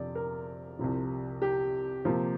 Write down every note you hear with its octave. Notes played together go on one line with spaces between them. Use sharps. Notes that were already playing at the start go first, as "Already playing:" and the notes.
Already playing: F2 C3 F3 D4 D5
A#4
C2 C3 F3
G4
C3 F3 A#3